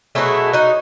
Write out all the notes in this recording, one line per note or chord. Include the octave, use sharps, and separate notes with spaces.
B2 F#3 A3 E4 G#4
D#4 F#4